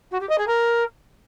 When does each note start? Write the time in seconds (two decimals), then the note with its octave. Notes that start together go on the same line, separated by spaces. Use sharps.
0.11 F#4
0.20 G4
0.29 D#5
0.38 G#4
0.47 A#4